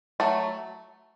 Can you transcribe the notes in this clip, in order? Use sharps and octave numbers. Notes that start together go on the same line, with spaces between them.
F#3 A3